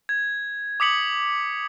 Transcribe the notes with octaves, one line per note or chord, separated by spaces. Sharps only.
G#6
D6 D#6 B6 C#7 F#7